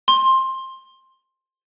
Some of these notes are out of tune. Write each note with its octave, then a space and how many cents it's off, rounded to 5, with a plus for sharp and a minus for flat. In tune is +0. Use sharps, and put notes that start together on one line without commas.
C6 +15